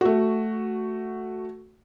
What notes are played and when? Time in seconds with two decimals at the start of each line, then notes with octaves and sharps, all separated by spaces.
0.01 A3 F#4